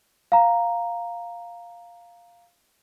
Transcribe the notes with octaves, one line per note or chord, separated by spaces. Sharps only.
F5 A#5